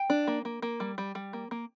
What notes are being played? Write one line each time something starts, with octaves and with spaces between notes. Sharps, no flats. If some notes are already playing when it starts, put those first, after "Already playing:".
Already playing: G5
D4
A#3
A#3
A#3
G3
G3
G3
A#3
A#3